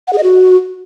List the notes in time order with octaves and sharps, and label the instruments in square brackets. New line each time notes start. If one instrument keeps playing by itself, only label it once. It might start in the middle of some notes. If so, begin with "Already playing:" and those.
[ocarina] F#5
G#4
D#5
F#4